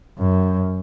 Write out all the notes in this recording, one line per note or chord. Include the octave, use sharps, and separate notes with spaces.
F#2